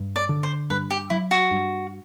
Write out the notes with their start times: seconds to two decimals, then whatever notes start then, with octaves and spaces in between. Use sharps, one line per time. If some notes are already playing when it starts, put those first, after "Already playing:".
Already playing: G2
0.16 D5
0.29 D3
0.43 C5
0.70 G2 B4
0.90 G4
1.10 F#3 E4
1.31 F#4
1.51 G2